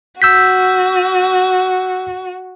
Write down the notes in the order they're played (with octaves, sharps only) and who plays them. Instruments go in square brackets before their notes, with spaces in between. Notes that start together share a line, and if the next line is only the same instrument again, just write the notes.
[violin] F#4 [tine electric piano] E6 G6 B6